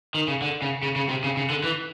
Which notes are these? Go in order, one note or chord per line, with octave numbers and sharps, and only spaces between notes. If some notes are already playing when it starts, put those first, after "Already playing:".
D#3
C#3
D3
C#3
C#3
C#3
C3
C#3
C#3
D3
E3